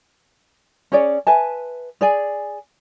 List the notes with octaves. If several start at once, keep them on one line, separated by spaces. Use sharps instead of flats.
C#4 G#4 C#5 D5
B4 E5 G#5 A5
G#4 D5 G#5